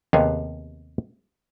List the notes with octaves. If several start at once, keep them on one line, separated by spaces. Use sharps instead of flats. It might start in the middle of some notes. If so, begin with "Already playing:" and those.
D#2 C3 B3 G#4 C#5 F5